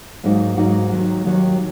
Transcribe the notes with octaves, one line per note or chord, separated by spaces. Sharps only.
G#2 F#3 A#3 D#4 F#4
G#2 F#3 A#3 D#4 F#4
D#2 D#3 F#3
D#2 D#3 F#3